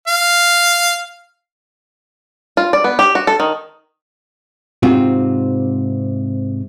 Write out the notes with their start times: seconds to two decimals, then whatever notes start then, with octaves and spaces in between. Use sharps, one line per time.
0.08 F5
2.57 F4
2.73 D5
2.84 B3
2.99 G4
3.15 F#4
3.27 A4
3.40 D#3
4.83 G#2 C3 C4 F4 F#4